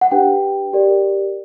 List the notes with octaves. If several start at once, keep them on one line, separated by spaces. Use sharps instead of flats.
F#5
D4 G4 B4 G5
G4 A#4 D5